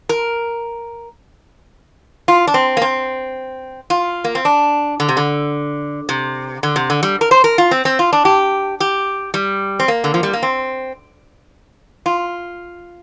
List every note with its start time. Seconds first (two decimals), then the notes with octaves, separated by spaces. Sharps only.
0.09 A#4
2.28 F4
2.47 D4
2.54 C4
2.77 A#3
2.82 C4
3.90 F4
4.24 A#3
4.35 C4
4.45 D4
5.00 D3
5.09 C3
5.17 D3
6.09 C3
6.63 D3
6.76 C3
6.90 D3
7.03 G3
7.21 A#4
7.31 C5
7.44 A#4
7.58 F4
7.71 C4
7.85 C4
7.99 F4
8.13 D4
8.25 G4
8.80 G4
9.34 G3
9.80 C4
9.88 A#3
10.04 D3
10.14 F3
10.23 G3
10.33 A#3
10.43 C4
12.06 F4